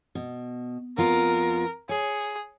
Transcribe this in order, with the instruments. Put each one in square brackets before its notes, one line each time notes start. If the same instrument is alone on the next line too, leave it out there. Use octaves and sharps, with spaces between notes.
[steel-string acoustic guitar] B2
[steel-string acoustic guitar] F2 B3 F4 [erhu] A#4
[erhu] G#4 [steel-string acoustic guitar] C#5